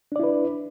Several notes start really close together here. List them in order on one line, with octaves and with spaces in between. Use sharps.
D4 D5 E4 B4